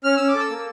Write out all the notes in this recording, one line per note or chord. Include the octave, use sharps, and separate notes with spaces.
C#4 F6
C#4 E6
D6
A4
E6
A#3